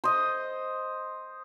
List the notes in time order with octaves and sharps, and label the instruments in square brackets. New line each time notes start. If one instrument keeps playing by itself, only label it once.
[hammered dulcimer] C5 D#5